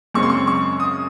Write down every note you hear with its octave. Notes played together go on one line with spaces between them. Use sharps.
F#2 C#3 G#3 C4 C#6
C6
C#6
C#6
D#6